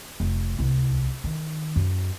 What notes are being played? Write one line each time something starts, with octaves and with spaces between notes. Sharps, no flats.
F1
D1 C2
D#3
F#2